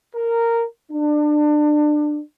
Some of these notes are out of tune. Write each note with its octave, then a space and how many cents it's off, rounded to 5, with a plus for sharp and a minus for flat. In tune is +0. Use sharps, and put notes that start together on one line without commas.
A#4 -10
D4 +25